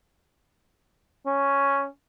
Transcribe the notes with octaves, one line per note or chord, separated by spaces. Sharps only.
C#4